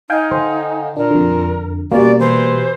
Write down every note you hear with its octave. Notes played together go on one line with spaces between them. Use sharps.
D#4 F5 G5 G#5
D3 C5
A#2 D4 A#4
F2 D3
B2 G3 A#3 C#4 D5
E3 C5